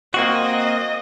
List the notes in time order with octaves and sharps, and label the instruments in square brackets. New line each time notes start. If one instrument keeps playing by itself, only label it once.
[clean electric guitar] A#3 C4 F#4 [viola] D#5